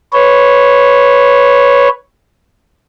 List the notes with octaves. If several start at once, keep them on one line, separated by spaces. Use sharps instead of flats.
B4 C#5